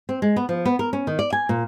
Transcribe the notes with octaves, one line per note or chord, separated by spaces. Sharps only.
C4
G#3
B3
F3
B3
A#4
C#4
D#3
D5
G#5
A#2